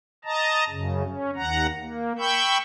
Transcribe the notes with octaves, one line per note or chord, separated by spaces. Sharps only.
D#5 A5 A#5
F#2 C#3
C#4
D#2 F#5 A#5
A#3
G5 B5 C#6 E6 G6